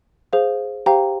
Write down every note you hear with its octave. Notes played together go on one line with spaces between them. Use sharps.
G#4 C5 F5
G4 C5 F5 G5 A#5